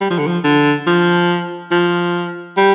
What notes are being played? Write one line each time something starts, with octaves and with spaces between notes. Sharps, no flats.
G3
F3
D3
F3
D3
F3
F3
G3